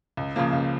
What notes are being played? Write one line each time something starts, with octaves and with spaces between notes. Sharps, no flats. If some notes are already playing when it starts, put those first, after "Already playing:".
C#2
C#3 F3 A#3
C#2